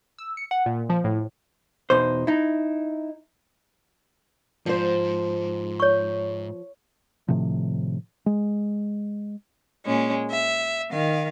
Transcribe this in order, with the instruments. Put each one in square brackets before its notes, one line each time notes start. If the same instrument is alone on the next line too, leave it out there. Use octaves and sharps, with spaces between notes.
[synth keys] E6
C#7
F#5
A#2
F3
A2
[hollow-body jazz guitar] E2 B2 D#4 C5
D#4 E4
[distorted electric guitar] G#2 [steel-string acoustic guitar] F3 C5
[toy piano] C#5 C#6
[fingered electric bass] A2 C3 D#3 F3
G#3
[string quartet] A#2 G#3 C#4
E5
D#3 F5